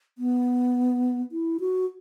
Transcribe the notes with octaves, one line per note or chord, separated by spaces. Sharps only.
B3
E4
F#4